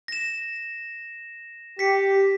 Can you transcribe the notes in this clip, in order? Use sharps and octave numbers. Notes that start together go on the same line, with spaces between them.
A#6 E7
G4 B6 C#7